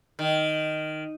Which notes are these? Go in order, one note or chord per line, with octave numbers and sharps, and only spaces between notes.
D#3